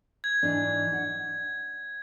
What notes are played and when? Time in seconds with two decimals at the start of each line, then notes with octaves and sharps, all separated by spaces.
0.24 G#6
0.43 G#2 E3 D4
0.93 F#5